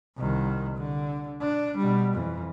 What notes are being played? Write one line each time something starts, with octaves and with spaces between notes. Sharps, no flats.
C2 D#3
D3
D4
B2 G3
F2 E3